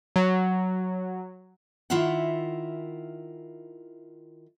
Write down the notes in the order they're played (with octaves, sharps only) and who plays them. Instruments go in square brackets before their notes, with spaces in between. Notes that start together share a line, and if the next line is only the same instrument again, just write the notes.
[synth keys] F#3
[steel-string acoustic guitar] D#3 E4 F4 A#4 E5 F#5